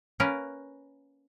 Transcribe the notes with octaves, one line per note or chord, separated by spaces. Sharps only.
A#3 C#4 A#4 B4